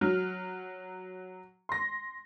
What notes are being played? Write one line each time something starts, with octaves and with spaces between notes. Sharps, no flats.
F#3 F6
C6 A#6